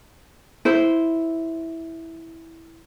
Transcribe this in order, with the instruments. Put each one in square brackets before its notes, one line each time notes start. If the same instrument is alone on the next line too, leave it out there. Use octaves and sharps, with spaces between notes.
[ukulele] E4 C5